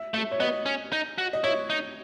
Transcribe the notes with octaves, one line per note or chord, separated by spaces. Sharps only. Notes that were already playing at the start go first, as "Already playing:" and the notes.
Already playing: E5
A3 E5
C#5
B3 D#5
C#4
D#4
F#4
D#5
E4 C#5
D#4